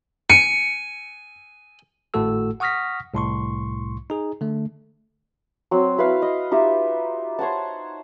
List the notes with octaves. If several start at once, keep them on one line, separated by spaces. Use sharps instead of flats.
G#5 C#7
G#1 A2 A3 F#4 A4 E6
F#5 C#6 D#6 F6 A#6 B6
C2 A2 C6 C#6
D#4 G#4
D3 A3
F#3 C4
E4 B4 E5 F5
D#5
D#4 F4 G4 E5
C5 C#5 F#5 A5